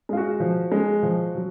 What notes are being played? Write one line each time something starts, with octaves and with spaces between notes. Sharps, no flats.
G#3 F4
F#4
F3
G#3
F3
F#3